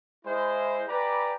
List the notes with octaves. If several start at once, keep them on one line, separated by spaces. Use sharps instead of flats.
G#3 E4 C5
G4 B4 D5 G#5 A#5 B5